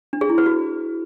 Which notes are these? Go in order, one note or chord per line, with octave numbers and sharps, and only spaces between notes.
D4
G#4
E4
B4
F#4